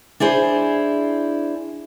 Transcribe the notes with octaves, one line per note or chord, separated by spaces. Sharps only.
D4 E4 G#4 C5